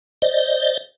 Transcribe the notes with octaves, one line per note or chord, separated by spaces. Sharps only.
C5 D5 D#5